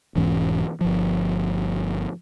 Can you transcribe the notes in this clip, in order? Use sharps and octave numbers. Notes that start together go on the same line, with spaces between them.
E1 G#2 E3 C#4
G1 F3